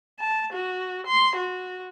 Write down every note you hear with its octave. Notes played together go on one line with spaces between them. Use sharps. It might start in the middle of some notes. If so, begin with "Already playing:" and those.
A5
F#4
C6
F#4